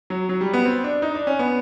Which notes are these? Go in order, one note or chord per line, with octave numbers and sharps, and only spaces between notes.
F#3
F#3
G3
B3
C4
D4
D#4
D4
C#4
B3